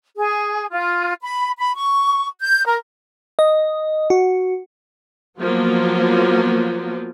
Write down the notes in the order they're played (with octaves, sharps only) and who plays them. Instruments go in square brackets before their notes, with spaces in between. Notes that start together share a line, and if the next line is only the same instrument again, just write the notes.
[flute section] G#4
F4
B5
B5
C#6
G6
A#4
[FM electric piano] D#5
F#4
[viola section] F3 F#3 A#3 B3 F4